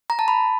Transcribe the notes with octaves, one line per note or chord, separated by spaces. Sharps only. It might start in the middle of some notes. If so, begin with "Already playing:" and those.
A#5
A5
B5